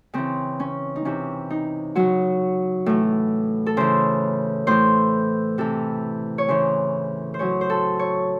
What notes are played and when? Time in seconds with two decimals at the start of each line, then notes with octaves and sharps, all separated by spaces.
0.14 C#3 E3 C4
0.60 C#4
0.96 D#4
1.05 C3 E3 C#4
1.50 D#4
1.95 C#3 F#3 F#4
2.86 A2 E3
3.66 A4
3.77 C#3 E3 C5
4.67 A2 E3 C5
5.58 C3 E3 A4
6.38 C#5
6.48 C#3 E3 C5
7.34 C5
7.39 C#3 F#3 C#5
7.61 C5
7.70 A4
7.99 C#5